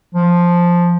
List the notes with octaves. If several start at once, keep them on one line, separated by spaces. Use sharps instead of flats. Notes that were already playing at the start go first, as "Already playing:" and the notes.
F3